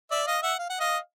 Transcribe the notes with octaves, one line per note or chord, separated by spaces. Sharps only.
D5 E5
D#5 F5
E5 F#5
F5
F#5
D#5 F5